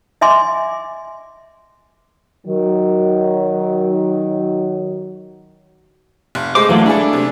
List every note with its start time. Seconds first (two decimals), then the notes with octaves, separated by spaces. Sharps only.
0.21 D#5 E5 G#5 C6 D6
2.47 D#3 F#3
6.35 F1
6.55 G#3 A3 C5 D6
6.69 E3 F#3 A3 A#3
6.86 D4 E4 G#4 A4
7.13 C3